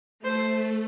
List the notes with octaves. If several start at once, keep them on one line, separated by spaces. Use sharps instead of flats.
A3 C5